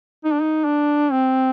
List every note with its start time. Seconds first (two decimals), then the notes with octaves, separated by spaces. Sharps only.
0.25 D#4
0.33 D4
0.42 D#4
0.65 D4
1.12 C4